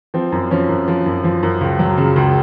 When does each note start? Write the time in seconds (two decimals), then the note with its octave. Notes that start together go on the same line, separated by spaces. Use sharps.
0.14 F3 C4
0.32 F#2
0.51 F3 C#4
0.69 F#2
0.88 F3
1.06 F#2
1.24 F3
1.43 F#2
1.61 C#2
1.79 F#3
1.98 C#3
2.16 C#2